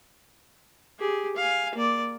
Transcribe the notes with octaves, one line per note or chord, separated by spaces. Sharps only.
G4 G#4
F5 G#5
A#3 D5